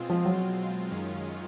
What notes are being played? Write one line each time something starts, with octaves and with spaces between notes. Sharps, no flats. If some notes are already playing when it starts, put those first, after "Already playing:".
Already playing: B2 G#3 C4 F4
F3
F#3
F#2 D#3 G#3 C#4 F4